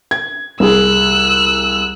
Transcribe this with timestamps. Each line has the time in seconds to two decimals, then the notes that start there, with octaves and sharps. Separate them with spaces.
0.11 G#6
0.60 C2 G#4 E6 F#6